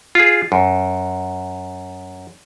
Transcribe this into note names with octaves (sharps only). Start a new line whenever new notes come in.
F4 G#4
F#2